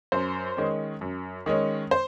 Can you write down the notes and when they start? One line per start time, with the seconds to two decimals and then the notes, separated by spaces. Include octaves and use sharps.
0.12 F#2 C5
0.57 D#3 G#3 C#4
1.01 F#2
1.46 D#3 G#3 C#4
1.91 C5